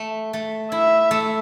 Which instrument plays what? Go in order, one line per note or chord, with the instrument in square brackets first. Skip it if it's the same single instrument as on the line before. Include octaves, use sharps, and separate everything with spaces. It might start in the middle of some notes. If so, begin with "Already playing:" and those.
Already playing: [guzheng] A3
A3
[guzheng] E4 [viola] E5
[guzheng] A3